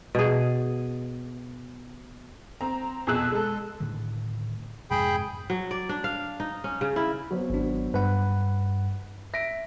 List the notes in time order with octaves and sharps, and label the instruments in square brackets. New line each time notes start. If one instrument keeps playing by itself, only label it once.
[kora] B2 G#4
[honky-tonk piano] C4 A#5
F2 B2 G#4 E6 F#6
G#3 A4
[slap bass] A2 D3 D#3
[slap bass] F2 G#2 C3 [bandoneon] G#4 G5 B5
[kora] F#3
D5
D4
F5
D#4
C#4
C#3
E4
[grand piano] F#3 B3 C4
[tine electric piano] G#1 D4
[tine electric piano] G2 F#5 [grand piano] B4
[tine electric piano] E5 [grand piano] A#6 B6 D7